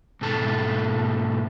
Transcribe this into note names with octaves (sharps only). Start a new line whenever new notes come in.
G#2 B2 A4 A5